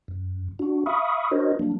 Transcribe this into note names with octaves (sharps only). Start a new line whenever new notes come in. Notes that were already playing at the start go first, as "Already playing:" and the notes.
F#2
D4 F#4
E5 F5 B5 C#6 D#6
D4 F#4 A#4 C5 C#5 D#5
F#3 A#3 D4